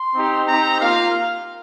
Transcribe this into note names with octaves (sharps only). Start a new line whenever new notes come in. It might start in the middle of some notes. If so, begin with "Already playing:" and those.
Already playing: C6
C4 D#4 G4
C4 D#4 G4 A#5
A#3 F4 F5